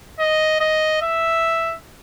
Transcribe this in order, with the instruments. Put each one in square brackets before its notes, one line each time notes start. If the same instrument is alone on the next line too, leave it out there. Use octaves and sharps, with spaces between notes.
[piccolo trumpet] D#5
D#5
E5